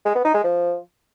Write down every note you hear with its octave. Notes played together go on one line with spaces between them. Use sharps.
G#3
B3
D#4
G#3
F3